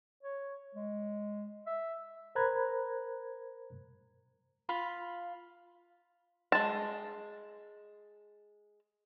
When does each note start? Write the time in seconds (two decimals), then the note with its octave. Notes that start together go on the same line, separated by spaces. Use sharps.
0.23 C#5
0.75 G#3
1.67 E5
2.35 A#4 C5 A#5 B5 F#6 G#6
4.69 F4 F5 B5
6.52 G#3 A5